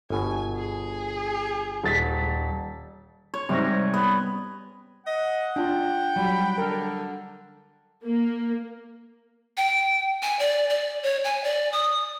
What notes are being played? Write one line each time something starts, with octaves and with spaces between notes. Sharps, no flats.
G1 B2 G#5
G#4
D#1 A6 B6
C#5
G#2 C3 G3 C#4 A#6
B3
D#5 F#5
D4 F4 G5
F#3 G3 B5
D3 A#4
A#3
G5
G#5
D5
D5
C#5
G#5
D5
D#6